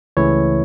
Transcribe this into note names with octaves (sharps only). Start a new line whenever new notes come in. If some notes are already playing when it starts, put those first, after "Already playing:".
C#2 C#3 E3 A3 E4 C#5